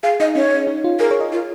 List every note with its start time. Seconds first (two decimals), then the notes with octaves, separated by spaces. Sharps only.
0.03 G#4 F5
0.20 D#4 D#5
0.35 C#4 C#5
0.67 D#4
0.84 F4
0.99 G#4 A#4
1.11 C#5
1.20 D#5
1.32 F4